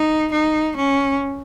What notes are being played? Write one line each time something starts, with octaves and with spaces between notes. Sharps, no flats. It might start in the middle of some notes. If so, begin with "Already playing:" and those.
Already playing: D#4
D#4
C#4